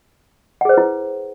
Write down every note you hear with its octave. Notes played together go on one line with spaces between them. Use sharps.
E4 G#4 B4 C5 F#5